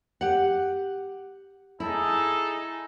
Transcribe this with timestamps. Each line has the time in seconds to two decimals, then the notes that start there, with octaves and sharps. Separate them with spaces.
0.21 G4 F#5
1.80 D#4 E4 G#4 A4